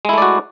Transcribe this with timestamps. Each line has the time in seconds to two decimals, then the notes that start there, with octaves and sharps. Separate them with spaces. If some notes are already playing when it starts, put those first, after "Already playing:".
0.05 G#3
0.09 E4
0.13 A3
0.18 D5
0.22 F#4